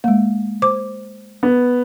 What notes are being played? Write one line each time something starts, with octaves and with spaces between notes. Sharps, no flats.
G#3 A#3
C5 D6
B3